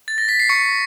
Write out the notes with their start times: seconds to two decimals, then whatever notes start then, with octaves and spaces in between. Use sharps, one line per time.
0.08 A6
0.18 A#6
0.29 B6
0.40 C7
0.49 C#6 C#7